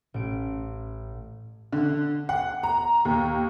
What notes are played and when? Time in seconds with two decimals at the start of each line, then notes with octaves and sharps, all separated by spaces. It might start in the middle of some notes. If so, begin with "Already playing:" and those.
0.14 A1 D7
1.73 D3
2.29 F#5
2.63 A#5
3.05 D#2